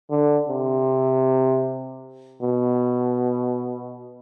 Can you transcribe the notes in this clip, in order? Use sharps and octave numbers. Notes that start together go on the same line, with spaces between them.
D3
C3
B2